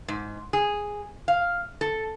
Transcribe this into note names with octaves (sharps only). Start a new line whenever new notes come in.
G#2
G#4
F5
A4